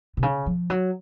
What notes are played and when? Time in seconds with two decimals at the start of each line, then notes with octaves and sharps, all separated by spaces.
0.17 C3
0.23 C#3
0.46 F3
0.70 F#3